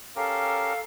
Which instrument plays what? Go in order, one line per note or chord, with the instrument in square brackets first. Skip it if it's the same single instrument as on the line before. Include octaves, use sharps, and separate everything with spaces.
[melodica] C#4 G4 A#4 [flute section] A4 F5